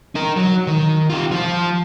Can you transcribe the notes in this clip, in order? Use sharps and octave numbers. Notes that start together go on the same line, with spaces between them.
D#4 A#4
F#3
D#3
F4 G4
F3 F4